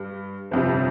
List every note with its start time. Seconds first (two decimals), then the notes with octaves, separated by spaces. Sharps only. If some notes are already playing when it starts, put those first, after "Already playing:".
Already playing: G2 G3
0.51 G1 F2 C3